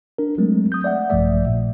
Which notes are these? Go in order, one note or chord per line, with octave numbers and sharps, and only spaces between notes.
D4 A#4
F#3 G#3 A3 C4
D#6 G6
D5 E5 F#5
A#1 G2 F3 A3 D5 E5
A#2